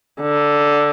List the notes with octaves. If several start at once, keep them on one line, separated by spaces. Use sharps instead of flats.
D3